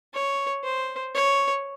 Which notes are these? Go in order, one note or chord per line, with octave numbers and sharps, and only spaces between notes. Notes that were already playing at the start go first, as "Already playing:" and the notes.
C#5
C5
C#5